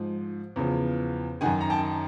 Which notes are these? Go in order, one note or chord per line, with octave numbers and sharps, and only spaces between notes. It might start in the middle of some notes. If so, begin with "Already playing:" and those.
Already playing: G#2 F3
E2 C#3 F3
F#2 D#3 F#5 G#5
A#5
G5 A5